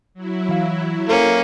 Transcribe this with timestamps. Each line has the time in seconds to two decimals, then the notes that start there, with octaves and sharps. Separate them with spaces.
0.14 F#3 E4
0.49 E3 F5
1.09 A#3 C#4 A4 C5 F5